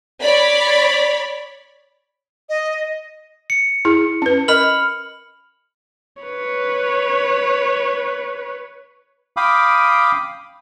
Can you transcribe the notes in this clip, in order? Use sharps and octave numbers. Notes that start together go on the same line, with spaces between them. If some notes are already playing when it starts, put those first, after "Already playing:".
C#5 D5 B5
D#5
C#7
E4 G#4
C#4 B4
A#4 D#5 B5 F6 F#7
B4 C#5
F5 G5 B5 D6 D#6